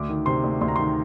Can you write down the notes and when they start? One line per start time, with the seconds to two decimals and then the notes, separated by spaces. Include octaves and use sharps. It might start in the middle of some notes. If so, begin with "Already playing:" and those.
Already playing: D2 D6
0.09 D#3
0.26 C3 C6
0.44 D2
0.61 D2 C6
0.68 A#5
0.76 D#3 C6